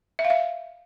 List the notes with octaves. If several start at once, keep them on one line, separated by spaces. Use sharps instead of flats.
E5
F5
E5